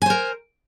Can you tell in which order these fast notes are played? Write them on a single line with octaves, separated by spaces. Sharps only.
G#5 C5 A#4